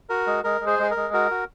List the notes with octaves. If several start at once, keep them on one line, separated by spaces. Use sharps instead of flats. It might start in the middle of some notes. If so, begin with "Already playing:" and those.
F#4 A#4
G#3
G#3 A#4
G#3
G#4 C5
G#3 G#4
A#4
G#3
F#4 A#4
F#4